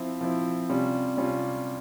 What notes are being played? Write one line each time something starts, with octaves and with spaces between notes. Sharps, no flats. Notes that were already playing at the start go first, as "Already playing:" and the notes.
Already playing: F3 C4 E4
F3 C4 E4
C3 G3 C#4 F4
C3 G3 C#4 F4